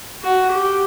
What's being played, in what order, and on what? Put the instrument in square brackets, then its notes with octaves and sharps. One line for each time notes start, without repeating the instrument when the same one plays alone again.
[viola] F#4
G4